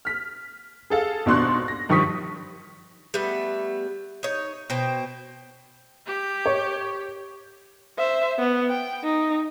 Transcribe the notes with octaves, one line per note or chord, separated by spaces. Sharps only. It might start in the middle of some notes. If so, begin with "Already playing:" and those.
F6 B6
G#4 A4 F5
G#1 B2 D4 C6 C#6 F#6
A#6
G2 D#3 F3 C#6 D#6 B6
G3 A3 B3
D#4 C#5
B2 C5 G5
G4
C#5
C5 E5
B3
G5
D#4